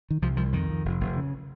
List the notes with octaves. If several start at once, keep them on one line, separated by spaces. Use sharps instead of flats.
D#3
C2 F3
C2 F3
F2 D#3
F2
F1
F1
C#3